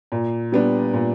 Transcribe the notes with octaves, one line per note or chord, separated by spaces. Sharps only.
A#2
G3 B3 D4
A#2